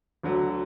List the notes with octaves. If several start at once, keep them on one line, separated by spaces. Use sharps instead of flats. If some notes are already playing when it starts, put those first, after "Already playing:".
D2 D3 F#3